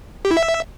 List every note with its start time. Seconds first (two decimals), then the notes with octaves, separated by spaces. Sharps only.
0.25 G4
0.31 E4
0.37 E5